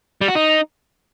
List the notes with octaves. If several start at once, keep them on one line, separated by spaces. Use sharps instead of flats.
G3
F#4
D#4